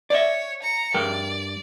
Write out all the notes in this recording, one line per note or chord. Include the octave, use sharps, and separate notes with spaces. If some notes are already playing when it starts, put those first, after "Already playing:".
C#5 D5 E5
A#5 C#7
G2 A#4 D5 G5